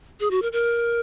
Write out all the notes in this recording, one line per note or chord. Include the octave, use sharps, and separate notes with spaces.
G#4
F#4
A#4
A#4